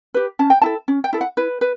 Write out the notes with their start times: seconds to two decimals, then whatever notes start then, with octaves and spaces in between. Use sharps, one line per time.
0.14 G4 B4
0.39 C#4 A5
0.50 G5
0.62 E4 A4 A5
0.88 C#4
1.04 G5
1.13 E4 A4
1.21 F#5
1.37 E4 B4
1.61 B4